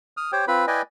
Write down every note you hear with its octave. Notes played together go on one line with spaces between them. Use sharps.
D#6 F6
G4 C5 C#5 G5
C4 F4 B4 B5
E4 B4 D5 D#5 G5 G#5